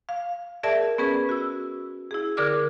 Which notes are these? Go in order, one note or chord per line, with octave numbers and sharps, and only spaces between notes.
F5
G#4 A#4 D5 E5 A5
B3 C#4 G#4 B4
F#4 E6
E4 G#4
D3 G#4 A#4 D5 D6 F6